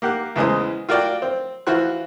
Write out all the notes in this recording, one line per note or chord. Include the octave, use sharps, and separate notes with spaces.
A#3 G4 F#5 F#6
E2 C#3 E3 G#3 C5 D#6
F4 F#4 A#4 D5 G5
C4
E3 F4 F#4 C5 F#6